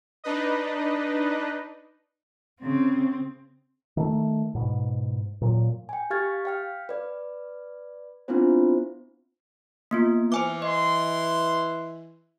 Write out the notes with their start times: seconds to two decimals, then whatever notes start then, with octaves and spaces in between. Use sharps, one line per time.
0.24 D4 D#4 B4 D#5
2.61 C#3 C4
3.97 D#3 A3
4.55 G#2 B2
5.42 A#2 F#3
5.89 G5 G#5
6.10 G4 F5 C#6 F6 G#6 A6
6.45 F5 G5 F6
6.89 B4 D5
8.28 B3 C4 D4 E4 F4 C5
9.91 A#3 B3 F4
10.32 E3 C5 G#5 D6
10.62 D#5 C6